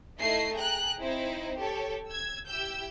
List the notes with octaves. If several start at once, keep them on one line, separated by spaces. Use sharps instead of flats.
A3 D#4 E4 D#5 E5 C7
G#4 G5 A#5 F#6
C4 D#4 E4 C5
G4 A4 C#5
E6 G#6
E4 G4 E6 G6